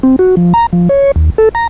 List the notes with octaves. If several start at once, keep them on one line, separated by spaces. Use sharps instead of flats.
C4
F#4
F3
A#5
F3
C#5
D#2
A4
A#5